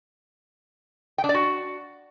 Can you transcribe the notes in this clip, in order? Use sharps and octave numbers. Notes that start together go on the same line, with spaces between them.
G5
D4
D5
F#4